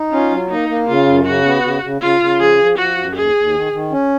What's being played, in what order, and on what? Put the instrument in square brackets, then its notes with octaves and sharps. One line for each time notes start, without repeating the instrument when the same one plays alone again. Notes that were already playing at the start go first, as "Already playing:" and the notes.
Already playing: [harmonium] D#4
[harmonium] C#4 [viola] F4
[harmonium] F#3
[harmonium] A#3 [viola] D#4
[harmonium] A#3
[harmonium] C#3 [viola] F4
[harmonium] F#2
[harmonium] C#3 [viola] F#4
[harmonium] B3
C#3
C#3
[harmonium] C#3 [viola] F4
[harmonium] C#3
[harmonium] F3 [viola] G#4
[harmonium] F3
[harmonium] F3 [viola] F#4
[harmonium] F#2
[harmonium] D#2 [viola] G#4
[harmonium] D#2
D#3
D#3
C#4